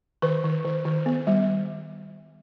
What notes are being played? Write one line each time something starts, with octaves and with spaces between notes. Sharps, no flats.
D#3 B4
D#3
D#3
D#3
B3
G3